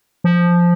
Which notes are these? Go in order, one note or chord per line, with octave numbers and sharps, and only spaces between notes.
F3